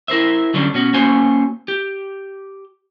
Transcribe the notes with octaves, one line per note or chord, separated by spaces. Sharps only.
E4 A#4 C5 E5
D3 F#3 G3 C#4 D4
B2 C#4 F#4
A#3 C#4 F#4 C5 C#5 G#5
G4